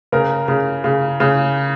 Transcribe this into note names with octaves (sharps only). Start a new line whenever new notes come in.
C#3 A#4
C#3
C#3
C#3